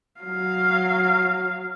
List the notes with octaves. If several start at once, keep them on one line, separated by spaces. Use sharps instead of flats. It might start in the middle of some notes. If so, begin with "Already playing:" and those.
F#3 F5